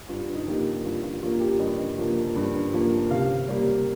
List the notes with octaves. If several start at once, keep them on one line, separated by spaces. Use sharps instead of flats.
G2 F4
D#4
F3 A#3 G4
F4
G2 F4
F4
F3 A#3 F4
G4
G2 D#5
F3 A#3
G2
F3 A#3
C3 F5
G3 A#3